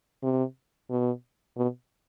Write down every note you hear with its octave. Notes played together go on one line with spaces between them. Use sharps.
C3
B2
B2